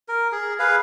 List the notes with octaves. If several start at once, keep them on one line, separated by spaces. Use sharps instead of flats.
A#4
G#4
G#4 B4 F5